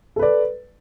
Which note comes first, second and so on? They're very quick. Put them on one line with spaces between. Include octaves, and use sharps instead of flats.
A4 B4 D5